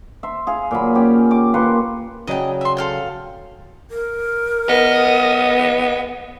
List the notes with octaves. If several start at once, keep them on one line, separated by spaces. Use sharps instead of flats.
E5 C6
G#4 F5
A#2 F#3 B5
C#4 G4 C#5
D6
A#3 B4 C6 C#6
C#3 F#3 D5 D#5 G5
E5 C6
A4 F5 G5
A#4
B3 D#5